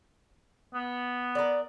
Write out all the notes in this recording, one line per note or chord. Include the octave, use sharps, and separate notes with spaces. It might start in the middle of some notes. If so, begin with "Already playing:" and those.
B3
A#4 D5